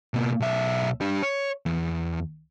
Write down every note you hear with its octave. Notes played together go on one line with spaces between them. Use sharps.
B2 A#3
B1 E5
D4 G4
C#5
E2